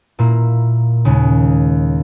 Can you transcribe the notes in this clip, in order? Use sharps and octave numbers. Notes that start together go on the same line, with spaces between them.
A#2 A#3 E4
D#2 C#3 G#3